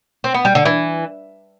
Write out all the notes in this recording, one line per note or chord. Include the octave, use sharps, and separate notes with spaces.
C4
B3
G3
D3
E3